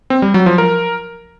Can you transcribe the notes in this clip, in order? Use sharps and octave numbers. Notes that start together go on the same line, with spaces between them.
C4
G3
F#3
F3
A#4